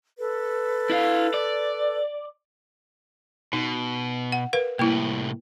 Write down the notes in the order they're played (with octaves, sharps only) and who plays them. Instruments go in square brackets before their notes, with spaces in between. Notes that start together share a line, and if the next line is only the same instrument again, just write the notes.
[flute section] A4 B4
[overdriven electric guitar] E4 F5
D5
[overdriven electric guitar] B2 [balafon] D#4
[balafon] F#5
A#4 B4 F5
[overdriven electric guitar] C2 A2 [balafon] A#3 E4